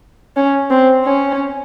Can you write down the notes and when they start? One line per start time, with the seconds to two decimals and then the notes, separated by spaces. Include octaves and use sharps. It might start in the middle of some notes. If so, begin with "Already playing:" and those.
0.36 C#4
0.70 C4
1.05 C#4